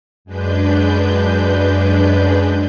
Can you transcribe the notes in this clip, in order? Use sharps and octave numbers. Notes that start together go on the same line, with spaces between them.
F#2 G#3 D4 B4 G6